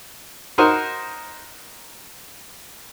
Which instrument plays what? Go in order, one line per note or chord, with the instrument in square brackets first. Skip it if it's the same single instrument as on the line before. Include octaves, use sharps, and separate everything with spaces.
[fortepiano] D#4 F#4 A#4 C5